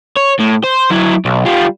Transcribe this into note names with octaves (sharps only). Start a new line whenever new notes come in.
C#5
A2
C5
F#3 E4
B1
G3 F4